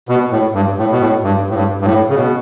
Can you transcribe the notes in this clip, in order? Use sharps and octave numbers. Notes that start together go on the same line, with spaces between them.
B2
A2
G2
A2
B2
A2
G2
A2
G2
G2
A2
C#3
B2